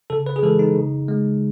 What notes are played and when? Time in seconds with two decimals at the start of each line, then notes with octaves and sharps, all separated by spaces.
0.10 C#3 A4
0.26 B4
0.36 G#4
0.43 E3 G#3 A4
0.59 D#4
0.76 C#3
1.09 G#3